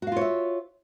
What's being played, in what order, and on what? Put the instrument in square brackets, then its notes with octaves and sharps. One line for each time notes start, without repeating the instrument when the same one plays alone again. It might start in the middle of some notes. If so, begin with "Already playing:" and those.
[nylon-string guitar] F#4
F5
F4
C#5
E5